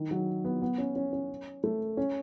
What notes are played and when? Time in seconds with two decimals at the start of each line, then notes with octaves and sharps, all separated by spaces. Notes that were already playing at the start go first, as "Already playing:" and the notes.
Already playing: D#3
0.11 F#3
0.45 B3
0.62 B3
0.78 C#4
0.96 C#4
1.13 C#4
1.64 A3
1.97 C#4